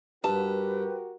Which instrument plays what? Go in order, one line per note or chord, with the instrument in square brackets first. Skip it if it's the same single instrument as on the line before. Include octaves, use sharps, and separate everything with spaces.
[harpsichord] G2 [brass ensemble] F#4 G4 A#4 [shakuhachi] B4 [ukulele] A5